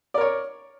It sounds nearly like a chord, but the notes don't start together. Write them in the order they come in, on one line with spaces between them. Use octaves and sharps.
D5 A#4 C#5